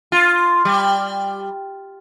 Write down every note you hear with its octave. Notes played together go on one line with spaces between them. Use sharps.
F4
G3